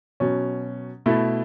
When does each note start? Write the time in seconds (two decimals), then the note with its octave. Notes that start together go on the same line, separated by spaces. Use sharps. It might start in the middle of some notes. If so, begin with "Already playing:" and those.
0.20 B2 F#3 C#4
1.06 B2 A3 E4